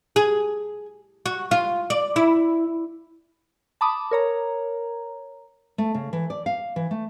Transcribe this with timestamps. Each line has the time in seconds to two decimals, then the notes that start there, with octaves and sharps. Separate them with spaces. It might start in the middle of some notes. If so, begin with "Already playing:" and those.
0.16 G#4
1.26 F#4
1.51 F4
1.90 D5
2.16 E4
3.81 A5 B5 D6 D#6
4.11 A#4 C#5 A#5
5.78 A3
5.94 C#3
6.13 E3
6.30 D5
6.46 F5
6.76 E3
6.91 A3